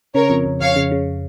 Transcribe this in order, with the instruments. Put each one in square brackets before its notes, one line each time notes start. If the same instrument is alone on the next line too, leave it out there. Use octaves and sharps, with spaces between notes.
[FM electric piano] C#3 [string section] A#4 C#5
[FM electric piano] F2
F2
[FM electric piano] F2 [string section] C#5 F5
[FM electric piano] C#3
C#3